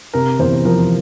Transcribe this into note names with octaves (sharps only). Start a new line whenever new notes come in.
C3 A#4
E2 C5
F3 A#4